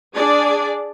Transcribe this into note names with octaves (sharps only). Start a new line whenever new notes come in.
D4 G#4 D5